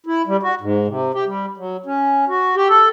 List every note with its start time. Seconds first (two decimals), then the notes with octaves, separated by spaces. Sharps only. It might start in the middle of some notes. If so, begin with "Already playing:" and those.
0.06 E4
0.27 G3
0.43 F#4
0.61 G#2
0.88 C3
1.14 G4
1.26 G3
1.57 F#3
1.86 C#4
2.28 F#4
2.56 G4
2.69 A4